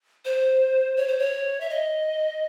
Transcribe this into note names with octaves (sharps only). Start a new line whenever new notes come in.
C5
C#5
C5
C#5
E5
D#5